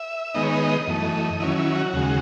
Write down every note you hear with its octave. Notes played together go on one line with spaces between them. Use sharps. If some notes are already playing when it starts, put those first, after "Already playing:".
Already playing: E5
D#3 G#3 B3 D#4 D#5
C#5
D#5
F#2 E3 A3
D#3 F#3 C#4 E4
E4
F#4
D#2 C#3 G#3